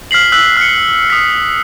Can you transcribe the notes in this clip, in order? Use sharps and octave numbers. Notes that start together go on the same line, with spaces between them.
F6 B6 C7 F#7
E6 F#6 B6 F#7
F6 C#7
D#6 B6